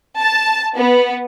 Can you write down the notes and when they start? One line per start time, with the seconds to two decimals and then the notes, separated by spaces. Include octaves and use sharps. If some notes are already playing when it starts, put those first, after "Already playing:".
0.20 A5
0.77 B3